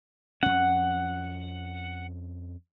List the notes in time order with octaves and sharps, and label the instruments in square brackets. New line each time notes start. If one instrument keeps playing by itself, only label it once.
[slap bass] F2 C#4 [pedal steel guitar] F#5